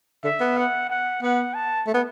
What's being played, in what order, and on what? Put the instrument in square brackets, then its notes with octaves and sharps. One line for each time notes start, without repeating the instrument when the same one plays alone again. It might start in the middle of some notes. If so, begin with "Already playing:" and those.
[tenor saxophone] D3 [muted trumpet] E5
[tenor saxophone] B3
[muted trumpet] F#5
F#5
[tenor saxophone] B3 [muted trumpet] F#5
[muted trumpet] A5
[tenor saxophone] A3
B3